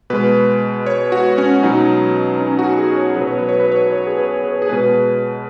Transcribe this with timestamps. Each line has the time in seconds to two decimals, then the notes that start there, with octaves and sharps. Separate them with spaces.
0.10 B2 G#3 B4
0.86 C#5
1.12 F#4
1.38 C#4
1.63 B2 F#3 D#4
2.40 C#4
2.59 F#4
2.73 F#4
2.78 G#4
2.97 C#5
3.16 B2 F#3 B4
3.27 C#5
3.38 B4
3.49 C#5
3.60 B4
3.72 C#5
3.82 B4
3.92 C#5
4.07 G#4
4.19 B4
4.44 B4
4.62 G#4
4.69 B2 G#3 B4